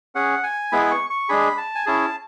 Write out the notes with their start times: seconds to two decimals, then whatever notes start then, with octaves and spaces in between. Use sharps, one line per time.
0.15 C#4 G#4 F#5
0.43 G#5
0.72 G#3 B3 E4 G#4 B5
0.91 C#6
1.10 C#6
1.29 G#3 D4 G#4 B5
1.58 A5
1.75 G#5
1.86 C#4 E4 G#4 A5